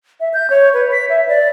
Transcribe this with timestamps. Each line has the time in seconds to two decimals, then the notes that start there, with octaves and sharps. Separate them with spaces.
0.20 E5
0.34 G6
0.50 C#5
0.74 B4
0.92 B6
1.09 E5
1.28 D5